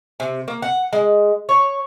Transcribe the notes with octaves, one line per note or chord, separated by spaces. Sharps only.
C3
A#3
F#5
G#3
C#5